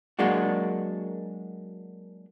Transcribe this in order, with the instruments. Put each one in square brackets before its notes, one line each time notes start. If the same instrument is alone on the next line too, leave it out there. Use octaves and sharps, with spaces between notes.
[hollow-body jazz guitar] F#3 G#3 A#3 D4 F#4